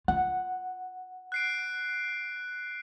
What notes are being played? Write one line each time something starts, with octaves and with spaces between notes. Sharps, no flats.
F4 F#5
F#6 C7 D7